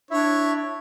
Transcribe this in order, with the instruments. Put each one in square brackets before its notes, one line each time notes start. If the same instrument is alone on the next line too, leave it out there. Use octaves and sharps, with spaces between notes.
[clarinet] D4 [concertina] E4 E5 [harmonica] C#5